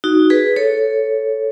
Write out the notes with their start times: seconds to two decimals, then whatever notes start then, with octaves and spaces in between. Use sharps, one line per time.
0.04 D#4 F#4
0.30 G#4 B4
0.56 A4 C#5